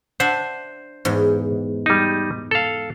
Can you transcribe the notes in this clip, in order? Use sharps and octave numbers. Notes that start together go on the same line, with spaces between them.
D4 C5 E5 F#5
E2 G#2
G3 D#4
A4 F5